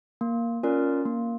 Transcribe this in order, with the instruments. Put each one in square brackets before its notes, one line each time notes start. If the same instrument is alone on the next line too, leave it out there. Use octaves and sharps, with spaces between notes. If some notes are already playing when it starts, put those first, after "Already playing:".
[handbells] A#3
C#4 F4 A#4 D5
A#3